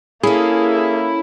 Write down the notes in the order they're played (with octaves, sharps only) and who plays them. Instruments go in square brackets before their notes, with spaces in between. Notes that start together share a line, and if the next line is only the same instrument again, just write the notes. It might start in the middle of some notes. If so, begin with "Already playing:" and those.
[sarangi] A#3 [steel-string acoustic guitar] C#4 A4 [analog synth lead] E4 [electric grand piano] G#4